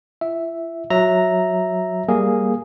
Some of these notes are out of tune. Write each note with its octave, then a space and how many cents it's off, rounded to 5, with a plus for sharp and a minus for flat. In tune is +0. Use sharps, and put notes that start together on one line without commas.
E4 +45 E5 +0
F#3 -15 E5 -5 A#5 +0
G3 +0 A#3 +0 G#4 +0